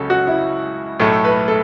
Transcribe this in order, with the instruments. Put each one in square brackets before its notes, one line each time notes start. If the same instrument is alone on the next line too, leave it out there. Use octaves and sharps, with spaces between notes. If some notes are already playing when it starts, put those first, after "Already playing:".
Already playing: [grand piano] C#2 C#3 F#3 C#4 [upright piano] A4
[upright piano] F#4
E4
[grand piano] B1 A2 A3 [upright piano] A4
[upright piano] B4
A4